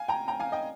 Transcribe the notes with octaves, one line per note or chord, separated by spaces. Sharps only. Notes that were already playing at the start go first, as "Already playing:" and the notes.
Already playing: F5 G#5
G5 A#5
G5 A#5
F5 G#5
D#5 G5